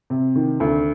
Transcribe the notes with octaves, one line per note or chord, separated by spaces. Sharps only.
C3
D#3
D2